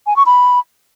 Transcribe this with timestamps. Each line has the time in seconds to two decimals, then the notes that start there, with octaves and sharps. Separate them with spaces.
0.07 G#5
0.16 C#6
0.26 B5